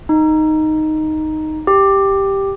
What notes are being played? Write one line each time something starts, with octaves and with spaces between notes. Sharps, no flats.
D#4
G4